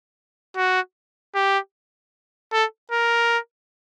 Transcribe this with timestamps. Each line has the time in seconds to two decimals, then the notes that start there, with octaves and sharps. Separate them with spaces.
0.57 F#4
1.35 G4
2.53 A4
2.91 A#4